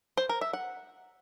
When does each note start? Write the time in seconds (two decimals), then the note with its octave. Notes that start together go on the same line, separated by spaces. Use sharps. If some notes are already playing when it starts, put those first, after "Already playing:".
0.17 C5
0.29 A#4
0.41 E5
0.53 F#5